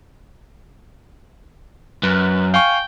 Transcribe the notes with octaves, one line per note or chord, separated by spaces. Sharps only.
F#2 B4
F5 G5 G#5 C#6